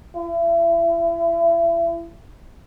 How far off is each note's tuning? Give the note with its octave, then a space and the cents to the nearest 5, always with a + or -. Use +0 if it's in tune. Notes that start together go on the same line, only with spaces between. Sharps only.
E4 +35